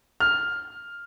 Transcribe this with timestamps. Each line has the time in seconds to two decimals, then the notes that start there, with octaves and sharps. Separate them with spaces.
0.20 F6